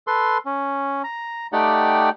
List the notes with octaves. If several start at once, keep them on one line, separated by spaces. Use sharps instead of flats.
A4 B4 C6
C#4
A#5
A3 D#4 G4 D5 F#5 G5